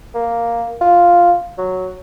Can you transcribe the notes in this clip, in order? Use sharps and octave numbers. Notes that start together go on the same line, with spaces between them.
A#3
F4
F#3